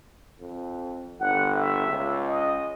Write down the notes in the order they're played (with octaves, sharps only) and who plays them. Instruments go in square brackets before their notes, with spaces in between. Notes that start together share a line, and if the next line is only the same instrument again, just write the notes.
[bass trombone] F2
[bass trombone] G1 [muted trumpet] F#5
[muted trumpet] E5
[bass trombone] C#2
[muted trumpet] D#5